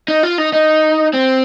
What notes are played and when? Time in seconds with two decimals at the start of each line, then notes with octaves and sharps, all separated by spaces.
0.08 D#4
0.23 F4
0.38 D#4
0.53 D#4
1.13 C4